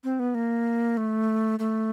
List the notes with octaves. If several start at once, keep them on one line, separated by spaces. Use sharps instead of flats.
C4
B3
A#3
A3
A3